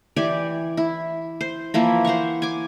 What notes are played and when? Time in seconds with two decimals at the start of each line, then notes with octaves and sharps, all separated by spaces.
0.16 E3 G4 D5 G#5
0.77 E4
1.41 C5
1.74 E3 F3 A#3 E4
2.04 C5 F#5 A#5 C#6
2.42 G#5 D6